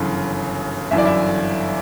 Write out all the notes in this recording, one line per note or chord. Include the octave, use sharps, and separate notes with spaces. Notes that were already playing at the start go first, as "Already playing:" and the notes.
Already playing: G1 F#2 C#3 E3
G1 F#2 E3 E5
D5
E4 E5